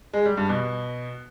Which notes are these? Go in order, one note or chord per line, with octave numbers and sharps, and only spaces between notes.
G#3
G3
G2
B2